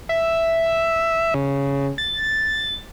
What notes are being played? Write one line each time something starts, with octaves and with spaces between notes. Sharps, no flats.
E5
C#3
A6